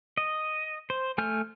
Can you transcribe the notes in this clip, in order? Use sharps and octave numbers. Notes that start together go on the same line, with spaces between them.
D#5
C5
A3 G#5 F6 G6